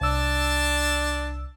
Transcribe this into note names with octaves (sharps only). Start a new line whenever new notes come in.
C2 D4 A5 E6